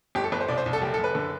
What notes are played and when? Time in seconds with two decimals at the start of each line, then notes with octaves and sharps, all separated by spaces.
0.15 G1 G4
0.24 A4
0.32 G1 B4
0.40 C5
0.48 C2 D5
0.58 C5
0.66 C2
0.73 A4
0.81 F#1 G4
0.94 A4
0.98 F#1
1.04 B4
1.15 D3